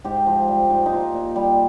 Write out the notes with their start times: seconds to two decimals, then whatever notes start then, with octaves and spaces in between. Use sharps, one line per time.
0.04 G#2 G4
0.26 F3
0.48 G3
0.70 G#2
0.86 D#4
0.92 A#2 F4
1.14 A#2
1.36 G3